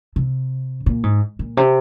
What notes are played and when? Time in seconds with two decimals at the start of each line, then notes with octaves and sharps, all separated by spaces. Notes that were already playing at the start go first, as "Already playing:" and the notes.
0.16 C3
0.86 A#2
1.03 G#2
1.39 A#2
1.57 C3